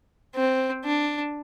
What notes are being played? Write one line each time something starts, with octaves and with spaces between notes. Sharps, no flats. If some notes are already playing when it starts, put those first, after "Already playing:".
C4
D4